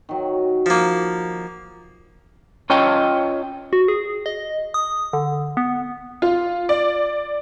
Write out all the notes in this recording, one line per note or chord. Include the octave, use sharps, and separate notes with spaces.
D#3 F#3
F3 A#3
C#4 F4 C#5 D#5 G5
F#4
G#4
D#5
D#6
D3
B3
F4
D5